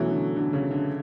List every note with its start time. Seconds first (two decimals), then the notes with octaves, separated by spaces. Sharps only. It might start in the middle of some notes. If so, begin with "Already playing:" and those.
Already playing: B2 E3 F#3 A3 C#4
0.11 D3
0.36 D3
0.53 C#3
0.71 D3